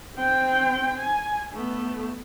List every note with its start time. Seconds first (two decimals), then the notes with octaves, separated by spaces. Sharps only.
0.16 C4 G5
0.99 G#5
1.53 A3 B3